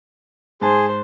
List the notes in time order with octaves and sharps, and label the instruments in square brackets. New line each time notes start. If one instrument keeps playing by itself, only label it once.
[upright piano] G#2 A5 [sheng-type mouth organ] G#4 [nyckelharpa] C5